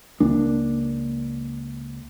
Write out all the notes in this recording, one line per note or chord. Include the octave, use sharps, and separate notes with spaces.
C#2 A#3 D4